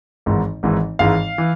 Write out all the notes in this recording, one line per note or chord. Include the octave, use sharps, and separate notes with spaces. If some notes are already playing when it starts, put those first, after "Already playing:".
G#1 G#2 E3
G#1 G#2 E3
G#1 G#2 E3 F5
E3